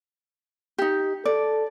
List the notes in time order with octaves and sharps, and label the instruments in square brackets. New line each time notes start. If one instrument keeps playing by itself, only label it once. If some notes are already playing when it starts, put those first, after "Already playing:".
[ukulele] D#4 G4
[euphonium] A4 [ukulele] D5